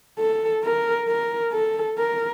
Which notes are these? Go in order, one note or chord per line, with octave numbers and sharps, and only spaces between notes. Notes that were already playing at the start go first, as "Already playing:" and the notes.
A4
A#4
A#4
A4
A#4